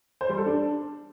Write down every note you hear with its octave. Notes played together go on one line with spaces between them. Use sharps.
C5
G3
A4
D4